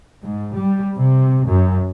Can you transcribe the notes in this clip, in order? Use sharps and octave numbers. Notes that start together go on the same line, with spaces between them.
G#2
G3
C3
F#2